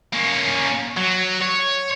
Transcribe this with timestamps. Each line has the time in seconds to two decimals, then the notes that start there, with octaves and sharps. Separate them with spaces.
0.13 A#3 C#4
0.97 F#3
1.41 C#5